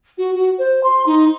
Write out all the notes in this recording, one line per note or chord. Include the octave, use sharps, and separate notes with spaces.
F#4
F#4
C5
C6
D#4